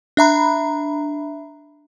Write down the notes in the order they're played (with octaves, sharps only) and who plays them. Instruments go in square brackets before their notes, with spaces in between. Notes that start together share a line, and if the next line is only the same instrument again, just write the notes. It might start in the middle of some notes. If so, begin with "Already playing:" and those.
[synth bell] D4 E5 A#5 B5